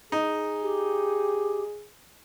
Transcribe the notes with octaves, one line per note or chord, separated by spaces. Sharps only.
D#4 G#4
G4